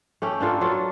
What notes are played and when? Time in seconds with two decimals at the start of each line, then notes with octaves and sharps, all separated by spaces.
0.22 A3 C#4 G4
0.40 A#3 D4 F4 A4
0.61 F#3 F4 A4